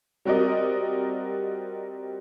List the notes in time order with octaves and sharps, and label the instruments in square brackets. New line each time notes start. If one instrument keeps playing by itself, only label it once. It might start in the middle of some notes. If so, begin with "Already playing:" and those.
[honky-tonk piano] G3 C4 F#4 A#4 D5 D#5